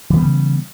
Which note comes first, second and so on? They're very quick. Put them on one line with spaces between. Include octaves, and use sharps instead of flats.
E3 B3 G3 C#3